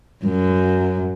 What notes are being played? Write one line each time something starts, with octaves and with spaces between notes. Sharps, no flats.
F#2